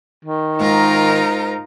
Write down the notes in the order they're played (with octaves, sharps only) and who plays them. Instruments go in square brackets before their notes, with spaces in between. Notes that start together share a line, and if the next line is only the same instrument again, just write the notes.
[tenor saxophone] D#3
[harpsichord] G#2 [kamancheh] D#4 A#4 [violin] F4 A#5